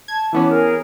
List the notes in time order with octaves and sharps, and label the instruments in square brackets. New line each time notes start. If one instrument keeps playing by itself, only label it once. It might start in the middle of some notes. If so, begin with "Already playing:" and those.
[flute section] A5 [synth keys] G#6
[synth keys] E3 B3 C#4 [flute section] A5 D6
[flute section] G#4 A#4